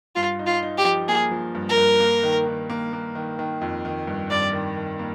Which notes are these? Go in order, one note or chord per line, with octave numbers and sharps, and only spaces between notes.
G2 F4
D#4
F4
D#4
G4
F3
A#3 G#4
F3
G2
A#4
G2
A#3
D#3
D#3
A#3
A#3
D#3
D#3
F2
D#3
G2
G2 D5
D#3
D#3
A#3